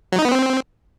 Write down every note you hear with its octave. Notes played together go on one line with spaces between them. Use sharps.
F#3
D#4
B3
C4